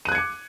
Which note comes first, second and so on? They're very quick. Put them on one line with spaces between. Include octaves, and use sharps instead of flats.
D#7 F#6 G#6 C#7 D6